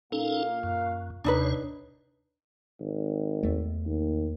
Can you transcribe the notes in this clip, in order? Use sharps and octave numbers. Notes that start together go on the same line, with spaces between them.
A#2 A#3 C#4 D#4 A4 F5
F#2
D#2 C3 D4 D#4 B4 C#5
G#1
E2 A3
D#2